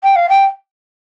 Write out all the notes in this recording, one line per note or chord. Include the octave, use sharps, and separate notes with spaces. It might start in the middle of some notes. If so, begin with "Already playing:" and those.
G5
F5
G5